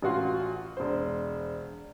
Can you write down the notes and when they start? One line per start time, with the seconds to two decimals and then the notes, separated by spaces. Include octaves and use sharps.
0.02 A1 F4 F#4 C6
0.77 E1 C5